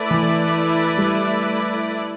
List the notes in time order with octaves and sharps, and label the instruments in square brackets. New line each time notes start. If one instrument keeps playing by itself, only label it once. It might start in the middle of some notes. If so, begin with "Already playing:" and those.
Already playing: [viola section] A3 E4 B4 D5
[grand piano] E3
G3